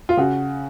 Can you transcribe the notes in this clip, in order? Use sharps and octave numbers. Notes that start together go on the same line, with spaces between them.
F4
C#3 F#4